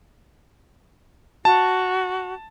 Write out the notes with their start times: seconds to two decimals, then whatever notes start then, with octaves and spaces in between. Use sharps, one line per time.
1.45 F#4 A5